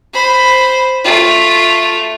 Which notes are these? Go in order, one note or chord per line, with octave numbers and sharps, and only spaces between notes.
C5 B5
A3 F4